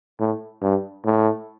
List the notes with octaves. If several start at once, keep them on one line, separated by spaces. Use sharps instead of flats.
A2
G2
A2